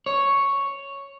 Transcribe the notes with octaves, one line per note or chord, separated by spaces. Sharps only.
C#5